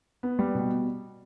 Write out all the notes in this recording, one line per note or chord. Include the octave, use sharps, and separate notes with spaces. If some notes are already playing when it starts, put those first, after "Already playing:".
B3
G3
B2